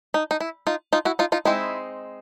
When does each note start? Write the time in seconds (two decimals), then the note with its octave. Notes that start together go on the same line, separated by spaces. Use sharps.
0.14 D#4
0.31 D#4
0.41 E4
0.67 D#4 F4
0.93 D#4 F4
1.05 E4 F#4
1.19 D#4 F4
1.32 D#4 F4
1.45 G#3 C4 D#4 E4